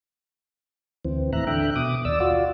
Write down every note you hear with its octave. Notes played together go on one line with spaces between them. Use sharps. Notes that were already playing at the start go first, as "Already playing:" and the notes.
D2 E3 C4
D#2 A2 E5 A#5 F#6
D3 E5 G5 F#6
B2 D6 D#6
D#2 D5 E6
F4 F#4 D5